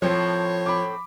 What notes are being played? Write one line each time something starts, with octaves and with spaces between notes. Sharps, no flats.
A2 F3 C4 C#5
B5 D6